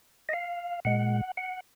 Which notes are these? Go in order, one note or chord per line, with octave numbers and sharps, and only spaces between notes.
D#5
F5
A#2 G#3 F#5
F#5